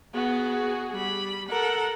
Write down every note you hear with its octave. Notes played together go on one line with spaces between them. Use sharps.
B3 F#4 G#4
G3 B5
A4 A#4 F#5